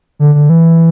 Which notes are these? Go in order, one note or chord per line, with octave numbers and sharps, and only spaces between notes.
D3
D3
E3